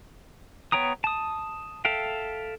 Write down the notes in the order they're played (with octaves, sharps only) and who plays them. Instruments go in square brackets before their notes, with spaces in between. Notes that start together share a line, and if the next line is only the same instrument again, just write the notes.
[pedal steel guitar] B3 C#5 G5 A#5 D#6
A5 D#6
A4 E5 F5 G5